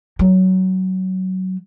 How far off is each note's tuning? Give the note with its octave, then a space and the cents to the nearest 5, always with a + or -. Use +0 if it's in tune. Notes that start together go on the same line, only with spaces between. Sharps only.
F#3 +15